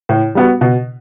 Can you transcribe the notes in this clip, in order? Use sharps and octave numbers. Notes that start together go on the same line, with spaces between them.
A2
G3 B3 F#4
B2